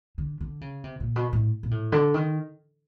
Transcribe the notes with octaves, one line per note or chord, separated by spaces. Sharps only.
D3
D3
C#3
C3
A#2
B2
A2
A#2
A2
D3
D#3